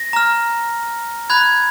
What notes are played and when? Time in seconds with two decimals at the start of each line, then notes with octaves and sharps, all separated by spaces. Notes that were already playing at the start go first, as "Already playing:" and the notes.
Already playing: A#6
0.13 A#5 F6
1.30 B5 F#6 G#6